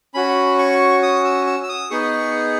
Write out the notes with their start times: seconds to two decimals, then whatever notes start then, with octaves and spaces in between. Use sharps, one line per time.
0.14 C#4 F#4 B5
0.59 C#6
1.03 D#6
1.25 E6
1.47 E6
1.63 E6
1.69 D#6
1.91 B3 D#4 G#4 C#6